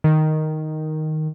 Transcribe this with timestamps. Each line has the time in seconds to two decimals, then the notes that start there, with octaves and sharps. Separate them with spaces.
0.04 D#3